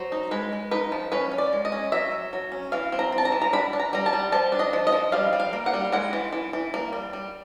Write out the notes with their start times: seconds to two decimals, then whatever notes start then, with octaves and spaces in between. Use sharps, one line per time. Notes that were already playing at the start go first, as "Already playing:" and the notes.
Already playing: F#3 C5
0.12 D#4
0.31 G#3 B4
0.52 G#3
0.71 D#4 B4
0.92 F3
1.12 C#4 B4
1.32 C#4
1.38 D5
1.53 G#3
1.65 D#5
1.72 C#4
1.92 F#3 E5
2.12 F#3
2.33 F#3
2.52 C#4
2.72 E3 F5
2.92 C4
2.99 A#5
3.12 C4
3.18 A5
3.25 A#5
3.32 E3
3.42 A#5
3.53 D4 B5
3.73 D4
3.80 A#5
3.93 G3 A#5
4.06 A5
4.13 G3
4.32 F3 A5
4.52 D4
4.59 D#5
4.73 F3
4.87 D#5
4.92 F3
5.12 G3 F5
5.33 G3
5.40 F5
5.53 A#3
5.66 F#5
5.73 G3
5.92 G#3 F#5
6.13 E3
6.33 E3
6.53 E3
6.74 A#3
6.93 G3
7.13 G3